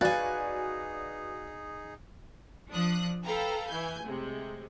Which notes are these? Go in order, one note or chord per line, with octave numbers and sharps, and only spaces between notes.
D#4 F#4 G#4 B4 D5 F5 G#5 A6
F3 D4 D#6 F#6
A4 B4 F5 G5 A#5
E3 G#5 G6
A2 C3 G#3